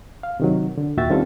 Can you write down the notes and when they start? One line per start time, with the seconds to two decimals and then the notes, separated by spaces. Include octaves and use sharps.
0.23 F5
0.40 C3 D#3 F#3
0.78 D3
0.97 D#2 A#2 F#4 E5 G5 A6
1.10 D#3 G3 C4 C#4 F4 A4